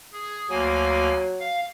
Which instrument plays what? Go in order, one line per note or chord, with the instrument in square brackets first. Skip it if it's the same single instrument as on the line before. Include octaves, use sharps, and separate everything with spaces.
[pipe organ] G#4
[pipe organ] D2 A#3 G#5 [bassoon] F#3
[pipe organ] F5